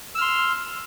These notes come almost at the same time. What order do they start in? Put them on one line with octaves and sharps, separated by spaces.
E6 F6 C6